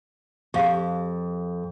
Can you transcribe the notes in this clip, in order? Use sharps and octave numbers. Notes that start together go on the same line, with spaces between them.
F2 G4 F5 C#6